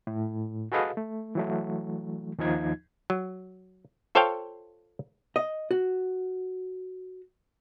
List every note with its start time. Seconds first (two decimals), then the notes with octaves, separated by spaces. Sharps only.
0.07 A2
0.72 F#4 G#4 A4 B4 D#5 F5
0.97 A3
1.35 E3 F#3 A3
2.38 D#2 F3 D#4 G#6
3.10 F#3
4.15 F4 A4 C5 C#5 F5 G5
5.36 D#5
5.71 F#4